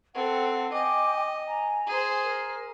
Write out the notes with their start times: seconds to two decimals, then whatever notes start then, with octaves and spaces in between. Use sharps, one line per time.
0.15 C4 A4 F#5 A5
0.72 D#5 G5 G#5 D6
1.46 G#5 A#5
1.87 G#4 C5
2.24 A#4